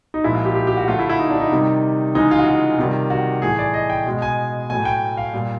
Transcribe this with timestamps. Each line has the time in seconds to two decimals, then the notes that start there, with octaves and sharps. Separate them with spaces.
0.14 D#4
0.24 A#2 F3 G#3 E4
0.35 F4
0.45 G4
0.55 G4
0.67 G4
0.77 F#4
0.87 D3 F#3 A3 F4
0.99 E4
1.09 E4
1.19 D#4
1.30 D4
1.40 D#4
1.52 C3 D#3 G3
2.15 C#3 E3 G#3 D#4
2.31 F4
2.39 F#4
2.47 F4
2.78 C3 D#3 G3
3.10 F#4
3.42 A2 E3 A3 G#4
3.59 D5
3.74 D#5
3.90 G5
4.06 B2 G#3
4.22 G#5
4.70 A2 F#3 A3 G#5
4.85 G5
5.17 F5
5.33 A#2 G3